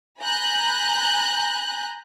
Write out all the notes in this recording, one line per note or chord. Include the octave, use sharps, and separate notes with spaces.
G#5 A#5 B5 F#6 G6